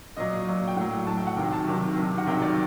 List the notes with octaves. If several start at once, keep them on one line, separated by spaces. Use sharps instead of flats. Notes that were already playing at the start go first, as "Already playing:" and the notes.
A#2 F#3 D#5
A#2 F#3
G5
A2 F#3 F#5
A2 F#3 A5
G5
F#5
C3 D#3 F#3 G5
A5
C3 D#3 F#3
C3 D#3 F#3
F#5
C3 D#3 F#3 G5
D5